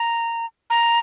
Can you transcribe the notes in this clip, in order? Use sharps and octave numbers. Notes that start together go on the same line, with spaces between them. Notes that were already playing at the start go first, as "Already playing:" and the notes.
Already playing: A#5
A#5